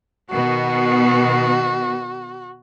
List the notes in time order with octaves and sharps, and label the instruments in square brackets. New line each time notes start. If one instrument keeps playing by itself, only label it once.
[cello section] B2 D#3 B3 [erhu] F#4